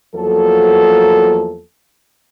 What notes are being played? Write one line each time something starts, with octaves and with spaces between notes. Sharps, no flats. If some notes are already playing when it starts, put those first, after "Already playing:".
E2 F3 F#3 A#3 A4